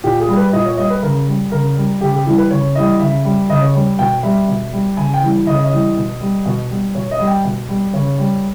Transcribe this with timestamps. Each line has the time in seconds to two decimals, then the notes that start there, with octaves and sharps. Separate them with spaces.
0.04 A#2 G4
0.20 G#4
0.29 G3
0.37 B4
0.53 A#2 D#5
0.66 C#5
0.77 G3 D#5
0.90 B4
1.02 C#3 A#4
1.27 G3
1.52 C#3 A#4
1.77 G3
2.01 C#3 G4
2.14 G4
2.25 E3 G3 E4
2.38 B4
2.50 C#3 C#5
2.75 E3 G3 D#5
2.99 C#3 E5
3.24 G3
3.50 C#3 D#5
3.62 C#5
3.74 G3
3.99 B2 G5
4.23 G3 E5
4.48 B2
4.72 G3
4.97 C#3 G#5
5.14 G5
5.22 E3 G3
5.46 C#3 D#5
5.56 C#5
5.64 D#5
5.71 E3 G3
5.96 B2
6.21 G3
6.45 B2
6.70 G3
6.94 B2 C#5
7.11 D#5
7.19 G3
7.28 G5
7.44 B2
7.68 G3
7.93 C#3 C#5
8.18 G3